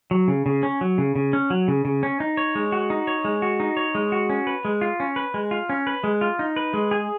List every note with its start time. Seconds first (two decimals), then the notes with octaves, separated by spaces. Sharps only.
0.11 F#3
0.28 C#3
0.46 C#3
0.63 C#4
0.81 F#3
0.98 C#3
1.16 C#3
1.33 C#4
1.50 F#3
1.68 C#3
1.85 C#3
2.03 C#4
2.20 D#4
2.37 C#5
2.55 G#3
2.72 F#4
2.90 D#4
3.07 C#5
3.25 G#3
3.42 F#4
3.60 D#4
3.77 C#5
3.95 G#3
4.12 F#4
4.30 C#4
4.47 B4
4.65 G#3
4.81 F4
5.00 C#4
5.16 B4
5.34 G#3
5.51 F4
5.69 C#4
5.87 B4
6.04 G#3
6.21 F4
6.39 D#4
6.56 B4
6.74 G#3
6.91 G#4